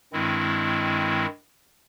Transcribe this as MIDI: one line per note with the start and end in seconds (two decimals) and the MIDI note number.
0.13 1.26 43
0.13 1.26 51
0.13 1.26 56
0.13 1.26 60
0.13 1.26 64